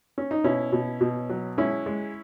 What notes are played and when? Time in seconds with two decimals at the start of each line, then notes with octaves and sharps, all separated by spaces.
0.18 C#4
0.31 D#4
0.44 B2 C#4 E4
0.72 B2
1.01 B2
1.30 F#3
1.58 G#3 C#4 E4
1.86 G#3